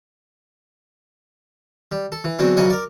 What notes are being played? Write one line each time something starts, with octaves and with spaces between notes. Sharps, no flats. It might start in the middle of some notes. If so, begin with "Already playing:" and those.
G3
A4
E3
E2 D3 F#3 C4 D4
A#1 C#3 F#3 D#5 F#5 G#5
A#4 D5